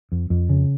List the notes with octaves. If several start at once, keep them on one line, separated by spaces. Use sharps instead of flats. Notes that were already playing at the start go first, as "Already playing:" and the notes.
F2
F2
C#3